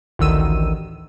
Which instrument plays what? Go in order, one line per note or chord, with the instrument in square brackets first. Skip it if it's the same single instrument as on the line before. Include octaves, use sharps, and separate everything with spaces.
[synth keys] A1 D2 D#3 E6 D#7